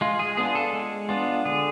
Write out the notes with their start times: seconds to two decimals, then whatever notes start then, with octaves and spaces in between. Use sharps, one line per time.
0.01 G#3 F4
0.19 G#4
0.37 B3 D4 F4 G#4
0.55 A4
0.73 G#3
1.09 B3 D4 F4
1.45 D3 G#4